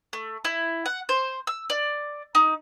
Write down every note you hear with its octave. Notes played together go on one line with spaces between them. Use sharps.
A3
E4
F#5
C5
E6
D5
D#4